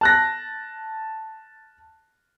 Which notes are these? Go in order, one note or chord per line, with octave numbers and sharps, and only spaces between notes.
A5 F#6 A#6